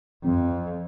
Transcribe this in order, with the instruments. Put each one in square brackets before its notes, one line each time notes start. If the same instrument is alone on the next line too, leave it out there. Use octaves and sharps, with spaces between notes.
[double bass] F2 [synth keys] F3 C4